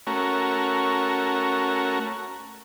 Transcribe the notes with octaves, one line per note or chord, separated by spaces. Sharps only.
A3 C#4 F#4 A#4